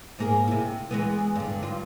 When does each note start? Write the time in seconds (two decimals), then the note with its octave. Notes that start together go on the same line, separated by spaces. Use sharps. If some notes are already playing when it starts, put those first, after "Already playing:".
0.19 G#2 A#3 G#4
0.48 C3 E4
0.91 E3 G#3 B3
1.35 G2 D3
1.63 G2 F4